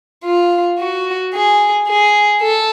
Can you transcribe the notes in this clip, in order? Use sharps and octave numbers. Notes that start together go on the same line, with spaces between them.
F4
F#4
G#4
G#4
A4